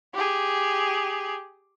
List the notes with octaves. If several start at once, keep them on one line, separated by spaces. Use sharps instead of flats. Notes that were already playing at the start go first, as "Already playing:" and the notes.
G4 G#4